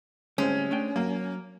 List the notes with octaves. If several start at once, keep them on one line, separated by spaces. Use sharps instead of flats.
D2 A2 G3 G#3 C4 C#4
A3 D4 G5
F#3 A#3